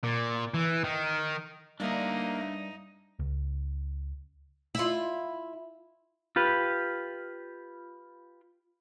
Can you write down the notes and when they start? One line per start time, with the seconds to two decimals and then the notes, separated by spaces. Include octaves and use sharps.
0.04 A#2
0.54 E3
0.84 D#3
1.80 G2 A#3 D4 D#4 E5
3.19 C#2
4.75 E4 F4
6.36 F4 G4 B4